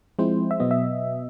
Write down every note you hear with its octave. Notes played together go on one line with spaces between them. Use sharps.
F3 G#3 C4 E4 C5
E5
B2 F#3 B3 D#5
E5